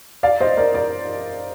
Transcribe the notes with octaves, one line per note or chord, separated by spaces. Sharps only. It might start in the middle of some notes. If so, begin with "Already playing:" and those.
D5 F5
C5 D#5
A#4 D5
A#4 D5